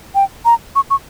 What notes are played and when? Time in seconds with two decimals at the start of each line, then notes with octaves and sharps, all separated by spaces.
0.15 G5
0.45 A#5
0.76 C#6
0.90 C#6